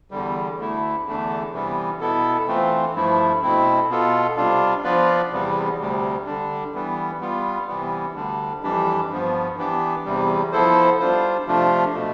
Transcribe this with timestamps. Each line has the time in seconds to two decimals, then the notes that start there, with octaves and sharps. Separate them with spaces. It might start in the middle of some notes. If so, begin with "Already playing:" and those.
0.11 E2 D3 G3
0.58 D2 D3 A3 E4
1.05 E2 D3 A3 D4
1.52 C3 E3 G3 B3
2.00 B2 B3 E4 A4
2.47 E3 A3 C4 F4
2.94 G2 F3 A3 E4
3.42 B2 A3 C4 E4
3.89 B2 B3 F4 A4
4.37 C3 G3 D4 F4
4.84 F3 B3 F4 B4 D5
5.32 E2 C3 G3 B3
5.79 D2 C3 G3
6.26 D3 G3 D4
6.74 E3 G3 B3
7.21 G3 B3 F4
7.68 C3 E3 G3 B3
8.15 D2 D3 G3 D4
8.63 F2 E3 G3 D4 G4
9.10 G2 F3 B3
9.57 E3 B3 D4 G4
10.05 E2 C3 G3
10.52 F3 B3 E4 A4 C5
11.00 G3 D4 F4 C5
11.47 C3 F3 A3 D4 F4
11.94 B2 A3